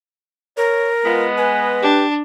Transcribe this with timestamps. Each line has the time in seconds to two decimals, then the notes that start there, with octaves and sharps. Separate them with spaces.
0.57 A#4 C#5
1.05 G#3 B3 F4 D#5
1.38 B4 G#5
1.82 D4 G4